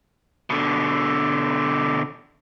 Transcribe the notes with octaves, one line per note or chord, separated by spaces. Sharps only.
B2 D3